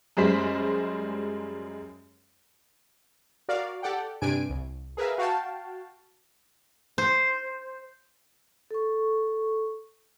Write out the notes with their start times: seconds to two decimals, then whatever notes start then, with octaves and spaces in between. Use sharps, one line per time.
0.17 F#2 G3 G#3 C5 B6
3.49 F#4 A#4 D5 F5
3.83 G4 A4 D5 F#5 G5
4.22 G2 C3 D4 G#5 D7
4.50 C2
4.97 G#4 A#4 B4 E5 F5
5.18 F#4 F5 G5 A5
6.98 C5
8.71 A4 C#6